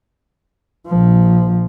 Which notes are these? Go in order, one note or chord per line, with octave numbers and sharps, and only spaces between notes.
A#1 F3